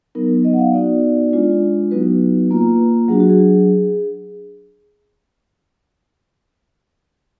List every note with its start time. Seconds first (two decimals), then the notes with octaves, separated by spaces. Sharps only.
0.15 F#3 B3 D#4 A#4
0.44 D#5
0.53 F#5
0.59 F5
0.73 B3 D#4 F#4 D5
1.33 G#3 D4 F4
1.91 F#3 B3 D#4 F#4 B4
2.51 A#3 F4
3.09 F#3 D4 F#4 G#4
3.20 F#4
3.30 G#4